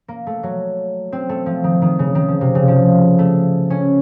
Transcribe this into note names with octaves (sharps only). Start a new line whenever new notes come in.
A#3
A3
F#3
C4
A3
F3
D#3
D#3
C#3
D#3
F3
C3
C#3
F3
A3
C#4